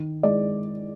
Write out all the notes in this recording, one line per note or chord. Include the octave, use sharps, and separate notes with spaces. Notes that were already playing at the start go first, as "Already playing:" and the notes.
Already playing: D#3
G#3 D5